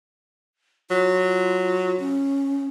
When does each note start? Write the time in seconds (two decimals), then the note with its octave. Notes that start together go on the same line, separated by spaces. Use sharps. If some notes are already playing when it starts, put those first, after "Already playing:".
0.91 F#3 F4
2.00 C#4